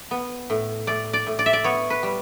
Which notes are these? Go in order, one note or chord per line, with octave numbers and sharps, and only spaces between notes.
B3
A2
A2 D5
D5
A2
D5
E5
D5
B3 C#5
B4
G3